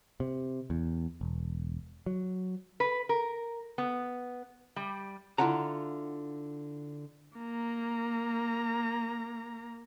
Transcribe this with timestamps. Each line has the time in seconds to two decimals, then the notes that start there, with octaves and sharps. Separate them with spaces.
0.20 C3
0.70 E2
1.21 E1
2.06 F#3
2.80 B4
3.09 A#4
3.78 B3
4.76 G3
5.38 D3 E4 F4 F#5 A#5
7.39 A#3 A#5